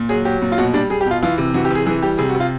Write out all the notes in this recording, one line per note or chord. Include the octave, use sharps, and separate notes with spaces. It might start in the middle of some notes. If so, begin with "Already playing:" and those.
Already playing: A#2
F#3 G#4
F#3 G4
A#2
F4
B2 F#4
G3 D4
G3 G#4
G4
B2 F4
E3 F4
C3
E3 F#4
G4
C3 G#4
E3 G#4
G3 G4
C3 G#4
F#4
C3
F4